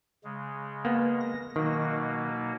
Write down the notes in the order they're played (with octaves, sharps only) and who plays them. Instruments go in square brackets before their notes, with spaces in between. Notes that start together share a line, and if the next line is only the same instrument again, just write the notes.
[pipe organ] C#3 G#3
[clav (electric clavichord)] A#3 B3
[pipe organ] A#6
[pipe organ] B2 F#3 A#3 [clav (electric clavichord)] D#3